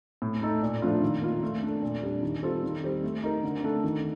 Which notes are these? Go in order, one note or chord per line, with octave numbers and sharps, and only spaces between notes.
A2
A3 D#4 A4
A#2
F3 A3 D4 F4
D#3
A#3 F4
A3
D4 A4
A#2
G3 D4
D#3
G3 C4 F4 A4
D#3
G3 C4 G4
A3
D#4 A#4
D3
A3 D4 A4
D#3